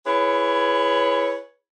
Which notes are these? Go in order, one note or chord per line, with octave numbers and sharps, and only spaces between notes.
E4 G#4 B4 C#5